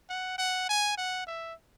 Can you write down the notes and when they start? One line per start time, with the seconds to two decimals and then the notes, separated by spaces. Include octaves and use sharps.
0.09 F#5
0.38 F#5
0.69 G#5
0.98 F#5
1.27 E5